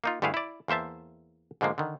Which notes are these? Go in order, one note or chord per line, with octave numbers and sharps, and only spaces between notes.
A#3 D#4 F4
G2 D3 A3 E4 G#4 F5
E4 D5
E2 A#3 C5 E5 A5
G#2 D3 F3 G#3 A#3
D3 D#3